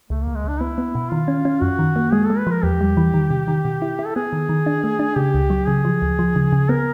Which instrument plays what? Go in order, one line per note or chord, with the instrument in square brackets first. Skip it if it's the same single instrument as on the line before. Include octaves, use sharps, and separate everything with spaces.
[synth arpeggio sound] C#2 [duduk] A3
[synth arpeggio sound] C#2 [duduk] A#3
[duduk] G#3
[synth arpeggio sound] C#2 [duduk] D4
[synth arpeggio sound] B3 [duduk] E4
[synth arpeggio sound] B3
B2
[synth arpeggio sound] D#3 [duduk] F4
[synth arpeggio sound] C#4
C#4
[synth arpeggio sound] F#2 [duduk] F#4
[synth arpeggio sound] D#3
A#3
[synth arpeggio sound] G#3 [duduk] G#4
[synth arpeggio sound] G#3 [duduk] A4
[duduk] B4
[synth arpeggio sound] F3 [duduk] A#4
[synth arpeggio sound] E2 [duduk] G4
[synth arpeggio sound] G3
E3
D#3
C3
D#3
B2
E4
E4
[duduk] A4
[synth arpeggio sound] B3 [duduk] G#4
[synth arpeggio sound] D#3
D#3
D4
A3
D4
[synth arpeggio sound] C#3 [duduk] G4
[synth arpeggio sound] C#2
F#3
[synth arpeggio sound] C#3 [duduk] G#4
[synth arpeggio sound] F3
D2
F3
C#3
C#3
[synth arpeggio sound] B3 [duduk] A#4